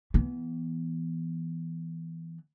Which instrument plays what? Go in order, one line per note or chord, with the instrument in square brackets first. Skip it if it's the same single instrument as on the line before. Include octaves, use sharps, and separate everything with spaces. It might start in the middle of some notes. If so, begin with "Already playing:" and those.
[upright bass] E3 B3